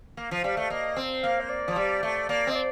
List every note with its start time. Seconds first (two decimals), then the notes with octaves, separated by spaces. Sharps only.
0.17 A#3
0.31 F3
0.44 G3 F5
0.57 A3
0.70 A#3 D#5
0.97 C4
1.23 A#3 F5
1.41 C5
1.49 D5
1.68 F3
1.76 G3
2.03 A3
2.29 A#3 D5
2.47 C4 D#5
2.55 D5